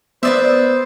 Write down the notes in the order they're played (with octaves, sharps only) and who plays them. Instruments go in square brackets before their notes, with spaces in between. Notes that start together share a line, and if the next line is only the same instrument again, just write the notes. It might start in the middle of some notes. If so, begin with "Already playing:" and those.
[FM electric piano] B3 D#6 [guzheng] B4 D5 E5 [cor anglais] C5